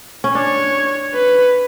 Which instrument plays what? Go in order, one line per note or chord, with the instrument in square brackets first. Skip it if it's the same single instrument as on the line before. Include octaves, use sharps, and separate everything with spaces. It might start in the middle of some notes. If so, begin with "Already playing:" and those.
[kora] C#4
[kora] D4 [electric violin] C#5
[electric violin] B4